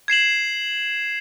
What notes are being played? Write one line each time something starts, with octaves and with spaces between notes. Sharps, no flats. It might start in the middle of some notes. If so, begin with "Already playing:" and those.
G#6 C7 E7 F#7